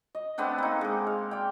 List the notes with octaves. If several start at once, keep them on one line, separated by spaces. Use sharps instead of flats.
D#5
A3 B3 C4 D4
A#3 D#4
G#3 D6
F5
D5 G5